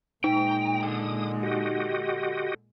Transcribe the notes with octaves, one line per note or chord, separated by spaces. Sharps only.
A#2 G#3 D#4 G5 A#5
D3 D#6
F#4 G4 D#5